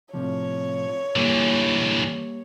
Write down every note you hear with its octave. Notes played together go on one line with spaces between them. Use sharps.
A2 C3 F3 C#5
D3 E3 G3 A#3